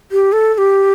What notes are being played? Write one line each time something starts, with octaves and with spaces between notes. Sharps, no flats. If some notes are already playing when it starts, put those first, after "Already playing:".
G4
A4
A4
G4